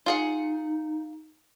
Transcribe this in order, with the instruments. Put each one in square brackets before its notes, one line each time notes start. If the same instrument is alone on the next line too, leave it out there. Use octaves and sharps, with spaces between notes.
[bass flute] D#4 [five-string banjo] F4 G#4 F#5